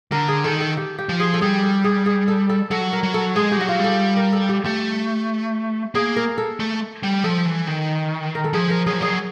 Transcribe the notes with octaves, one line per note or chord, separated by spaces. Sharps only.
D3 A#4
G#4
D#3 A4
A4
G4
G4
F3
G#4
A4
G3 G#4
A4
G#4
G#4
A4
A4
F#3 A4
A#4
F#3
A4
G#3 G#4
G4
F#3 F#4
F4
G3 A4
A#4
A4
G4
A3 G4
A#3 G#4
A#4
A4
A3
G3
F3 A4
E3
D#3
A#4
A4
F3 G#4
A#4
F#3 G#4
F3
F#3 G#4